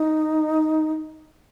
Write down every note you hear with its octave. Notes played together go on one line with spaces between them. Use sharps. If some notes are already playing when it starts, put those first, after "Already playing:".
Already playing: D#4